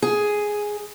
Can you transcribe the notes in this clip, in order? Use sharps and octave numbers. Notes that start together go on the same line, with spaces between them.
G#4